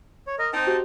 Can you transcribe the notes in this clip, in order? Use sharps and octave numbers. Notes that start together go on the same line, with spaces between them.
C#5
A#4 D#5
C4 D#4 A5
F#4 G4 C5